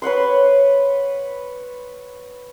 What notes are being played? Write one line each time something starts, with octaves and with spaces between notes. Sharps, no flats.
B4 C#5 F#5 C6